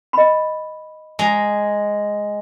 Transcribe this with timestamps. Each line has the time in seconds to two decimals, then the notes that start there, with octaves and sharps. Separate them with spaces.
0.13 D#5 B5
1.19 G#3 A#5